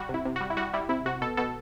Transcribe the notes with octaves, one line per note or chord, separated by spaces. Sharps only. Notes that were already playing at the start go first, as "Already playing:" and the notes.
Already playing: G3 F#4
C3
E4
C3
G3 F#4
E4
G3 F#4
G3 E4
C3 E4
C3 F#4
B2 A4
B2 A4